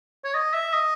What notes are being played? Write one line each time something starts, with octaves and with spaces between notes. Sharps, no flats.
C#5
D#5
E5
D#5